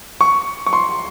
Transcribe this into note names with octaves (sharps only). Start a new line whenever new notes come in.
C#6
C#6
C6